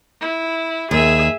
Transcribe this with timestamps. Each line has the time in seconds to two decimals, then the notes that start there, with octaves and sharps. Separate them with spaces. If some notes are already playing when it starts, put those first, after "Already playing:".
0.21 E4
0.91 D#2 G#4 E5